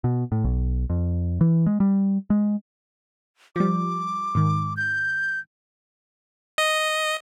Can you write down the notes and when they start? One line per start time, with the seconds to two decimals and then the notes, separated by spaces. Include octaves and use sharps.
0.04 B2
0.32 A2
0.44 B1
0.90 F2
1.41 E3
1.66 G#3
1.80 G3
2.30 G#3
3.56 F3 G3 D6
4.35 G#2 D#3
4.77 G6
6.58 D#5